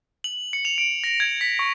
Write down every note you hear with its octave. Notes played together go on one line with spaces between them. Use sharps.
F#7
C#7
F7
D7
A#6
G#6
B6
C#6